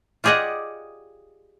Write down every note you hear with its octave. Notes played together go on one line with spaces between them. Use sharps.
F4 G4 G#4 D5 D#5 F#5